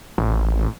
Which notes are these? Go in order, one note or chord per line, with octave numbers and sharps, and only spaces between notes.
A1